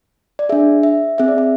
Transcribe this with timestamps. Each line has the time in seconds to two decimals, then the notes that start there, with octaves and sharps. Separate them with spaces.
0.39 D5
0.49 D4 G#4 E5
0.83 E5
1.18 C4 G#4 E5
1.28 D5
1.38 E5